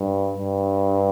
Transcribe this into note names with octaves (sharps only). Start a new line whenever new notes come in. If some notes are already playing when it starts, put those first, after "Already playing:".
Already playing: G2
G2